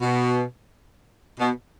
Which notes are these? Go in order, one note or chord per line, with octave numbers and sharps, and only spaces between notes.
B2
B2